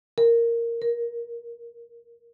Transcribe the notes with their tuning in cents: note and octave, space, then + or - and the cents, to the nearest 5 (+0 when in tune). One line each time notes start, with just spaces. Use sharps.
A#4 -5
A#4 +20